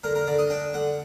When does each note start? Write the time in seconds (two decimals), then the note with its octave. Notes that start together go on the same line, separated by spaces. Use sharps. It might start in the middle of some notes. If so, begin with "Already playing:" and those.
0.04 D3 A#4
0.15 A#4
0.27 D3 D5
0.38 D#5
0.50 D4 G5
0.73 D3 F#5